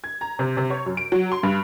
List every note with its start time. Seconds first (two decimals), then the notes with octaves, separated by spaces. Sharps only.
0.04 G#6
0.21 A#5
0.39 C3
0.57 C3
0.70 C#5
0.86 F#2
0.97 D7
1.12 F#3
1.32 C6
1.43 G2